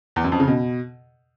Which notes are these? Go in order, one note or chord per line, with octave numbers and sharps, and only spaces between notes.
E2
F#2
F2
C#3
B2